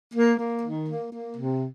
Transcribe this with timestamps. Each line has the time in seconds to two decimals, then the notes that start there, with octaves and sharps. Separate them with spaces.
0.14 A#3
0.38 A#3
0.62 D#3
0.87 A#3
1.11 A#3
1.36 C3